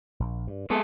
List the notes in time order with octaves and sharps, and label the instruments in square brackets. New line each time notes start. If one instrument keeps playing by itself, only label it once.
[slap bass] A#1
G2
[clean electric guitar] G#3 G#4 A4 [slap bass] B3